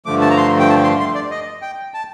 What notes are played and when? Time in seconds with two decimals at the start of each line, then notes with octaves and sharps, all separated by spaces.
0.06 G2 D3 F3 A3 D6
0.21 A5
0.30 A#5
0.37 C6
0.59 G5
0.69 A5
0.84 C6
1.00 C6
1.15 D5
1.31 D#5
1.62 G5
1.94 A5